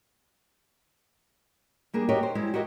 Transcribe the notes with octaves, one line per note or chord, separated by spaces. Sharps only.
G3 A#3 D4 G#4
F#4 G4 A#4 C#5 D#5
C5
G3 G#3 E4
F#4 G4 A#4 D#5 E5 F#5